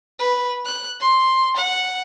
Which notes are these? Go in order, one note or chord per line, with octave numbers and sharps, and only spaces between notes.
B4
F#6
C6
F#5